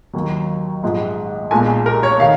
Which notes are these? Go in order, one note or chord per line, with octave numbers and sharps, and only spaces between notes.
D#2 D#3 F#3
A#1 G#2 F3 G#3
B1 A#2 G#3 G#5
A#4
C#5
D#3 F5